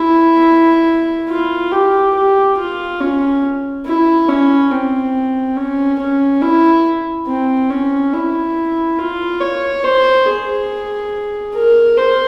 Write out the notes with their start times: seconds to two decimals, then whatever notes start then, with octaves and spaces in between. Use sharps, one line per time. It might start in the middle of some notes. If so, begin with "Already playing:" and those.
Already playing: E4
1.29 F4
1.72 G4
2.15 G4
2.57 F4
3.00 C#4
3.86 E4
4.29 C#4
4.71 C4
5.57 C#4
5.99 C#4
6.42 E4
7.27 C4
7.70 C#4
8.13 E4
8.99 F4
9.41 C#5
9.84 C5
10.26 G#4
11.54 A#4
11.97 C5